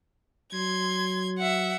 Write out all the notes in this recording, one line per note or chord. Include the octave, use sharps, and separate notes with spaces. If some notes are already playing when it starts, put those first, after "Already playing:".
F#3 C6 G#6
E5 F#5